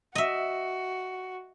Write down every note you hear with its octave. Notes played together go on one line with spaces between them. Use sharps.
F#4 D#5 E5